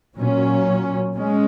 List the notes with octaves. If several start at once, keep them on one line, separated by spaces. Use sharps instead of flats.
A#2 F#3 C#4
G#3 C#4